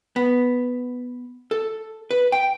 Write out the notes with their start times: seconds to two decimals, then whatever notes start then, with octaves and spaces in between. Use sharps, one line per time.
0.16 B3
1.51 A4
2.11 B4
2.32 G5